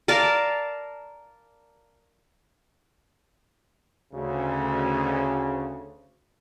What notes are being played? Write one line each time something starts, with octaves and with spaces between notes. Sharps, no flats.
A#4 D5 F5 A5
D2 C#3